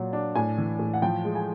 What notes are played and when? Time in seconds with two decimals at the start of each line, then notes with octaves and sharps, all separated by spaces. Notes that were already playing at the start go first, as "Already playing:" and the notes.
Already playing: A#2 F#3
0.13 D4
0.35 A2 G#5
0.58 E3
0.79 A2
0.94 F#5
1.02 F3 G5
1.25 G#3
1.35 G#5